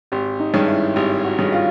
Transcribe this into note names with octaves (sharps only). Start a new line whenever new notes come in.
G#1 G4
D#4
G2 D#3 G#3 C#4
E4
G#1 G4
F#4
G2 D#3 G#3 C#4
F4